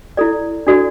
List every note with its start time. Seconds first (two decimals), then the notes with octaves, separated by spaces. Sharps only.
0.17 E4 A4 D5
0.67 D4 F#4 A4 D5